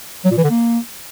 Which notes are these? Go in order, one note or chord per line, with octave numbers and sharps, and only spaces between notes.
F#3
A#2
E3
D3
A#3